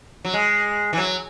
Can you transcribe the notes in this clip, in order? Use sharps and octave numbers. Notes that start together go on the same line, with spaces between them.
F#3
G#3
E3
F#3